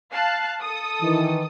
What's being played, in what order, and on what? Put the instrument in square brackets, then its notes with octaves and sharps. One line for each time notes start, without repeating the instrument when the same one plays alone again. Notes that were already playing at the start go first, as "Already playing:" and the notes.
[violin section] F5 A5 F#6
A4 D#6
[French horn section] D#3 E3